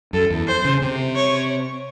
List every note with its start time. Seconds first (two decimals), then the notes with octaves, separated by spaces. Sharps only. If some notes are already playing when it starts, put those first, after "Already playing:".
0.13 F#2 A4
0.30 E2
0.47 C5
0.65 C#3
0.82 C3
1.16 C#5